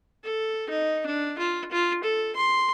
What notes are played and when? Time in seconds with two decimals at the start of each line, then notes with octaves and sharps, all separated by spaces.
0.24 A4
0.69 D#4
1.06 D4
1.39 F4
1.71 F4
2.04 A4
2.36 C6